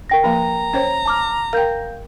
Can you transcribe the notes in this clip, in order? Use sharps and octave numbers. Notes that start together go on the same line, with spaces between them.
A#4 G5 A#6
F3 A#3 A#5
C#4 C5 C#5
A5 D6 F6
A#4 F5 G5 G6